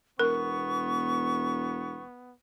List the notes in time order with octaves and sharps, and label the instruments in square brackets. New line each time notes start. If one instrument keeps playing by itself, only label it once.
[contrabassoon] E1 [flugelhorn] B3 [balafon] A#4 [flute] C#6